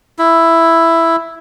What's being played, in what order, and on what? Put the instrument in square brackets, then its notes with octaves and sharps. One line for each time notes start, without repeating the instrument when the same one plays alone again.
[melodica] E4